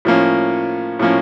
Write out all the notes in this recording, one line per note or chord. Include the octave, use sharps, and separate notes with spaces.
A2 F3 A#3 C#4
A2 F3 A#3 C#4